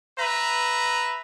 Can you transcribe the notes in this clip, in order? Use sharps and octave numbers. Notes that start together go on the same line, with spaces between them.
B4 E5 A#5